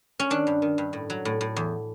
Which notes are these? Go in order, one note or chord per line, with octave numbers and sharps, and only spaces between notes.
C#4
D#3 D4
G2
D#3
G2
A2
F#3
A2
A2
E2